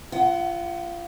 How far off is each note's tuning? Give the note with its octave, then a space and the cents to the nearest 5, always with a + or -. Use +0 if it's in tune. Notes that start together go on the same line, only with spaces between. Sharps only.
F4 -25 F#5 +20